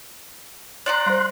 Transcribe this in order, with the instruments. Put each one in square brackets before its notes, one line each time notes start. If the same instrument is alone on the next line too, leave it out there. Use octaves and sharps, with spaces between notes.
[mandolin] D5 F#5 A#5 [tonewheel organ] C6 F#6
[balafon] G3 C5